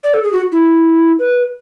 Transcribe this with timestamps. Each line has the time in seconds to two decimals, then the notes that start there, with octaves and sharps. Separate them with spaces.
0.04 D5
0.14 A4
0.23 G#4
0.33 F#4
0.52 E4
1.19 B4